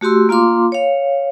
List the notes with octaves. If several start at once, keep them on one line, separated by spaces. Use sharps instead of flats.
A3 F#4 G4 C6 E6
A#3 F4 F5 C6 D6
C#5 F5